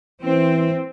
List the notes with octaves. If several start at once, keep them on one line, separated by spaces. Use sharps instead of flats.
E3 C4